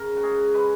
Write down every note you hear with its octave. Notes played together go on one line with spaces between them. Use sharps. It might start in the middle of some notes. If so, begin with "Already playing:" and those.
Already playing: C#3 A#4
F#4
G#3 G#4
G#3 B4